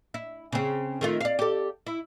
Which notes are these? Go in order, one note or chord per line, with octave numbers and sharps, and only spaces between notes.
E4
C#3 C4
D#3 A3 F4
D5 F5
G4 A4
E4